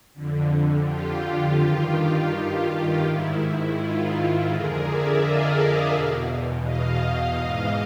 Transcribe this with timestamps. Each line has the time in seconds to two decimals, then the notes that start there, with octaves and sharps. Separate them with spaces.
0.14 F2 D3
0.86 F4 G4
1.58 G2 D#3
2.30 F4
3.03 G#2 D#3 E4
3.75 F4
4.48 F2 D3 G#4 A#4
4.83 D5 E5
5.20 D#5 F5
5.91 E2 B2
6.64 D#5 F5
7.00 D#5 F5
7.36 G#2 E3 D#5 F5